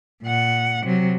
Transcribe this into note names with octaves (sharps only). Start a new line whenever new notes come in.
A#2 F#5
C3 F#3